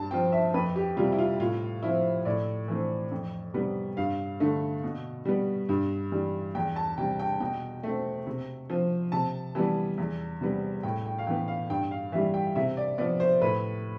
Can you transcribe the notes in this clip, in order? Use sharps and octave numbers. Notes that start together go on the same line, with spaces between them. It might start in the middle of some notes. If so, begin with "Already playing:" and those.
Already playing: G2 A5
F3 C4 G5
E5
F2 B4
G4
C3 G3 F4
E4
F4
A2 F4
F3 C4 E4
A2 D5
E3 A3 C4
F2
C3 G3 B3
G2 F5
D3 A3
B2
G3 B3
G2
E3 G3
E2 G5
A5
C3 G3 G5
G5
B2 G5
A3 C4
C3
F3 C4
C3 A5
E3 G3 B3
E2
C3 G3 B3
A2 G5
G5
F5
E3 B3 G5
F5
G2 G5
F5
E3 G3 E5
G5
C3 E5
D5
F3 B3 D5
C5
A2 B4